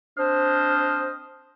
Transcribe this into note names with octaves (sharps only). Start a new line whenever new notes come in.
C4 D4 C5 D#5 F6